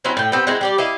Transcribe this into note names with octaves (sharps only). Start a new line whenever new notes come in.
F#3 C4 C#4 E4
A2 G5
B3 C4 G4
G#3 C4 E4 F#4
G3 G4 D5
E4 D#5 F5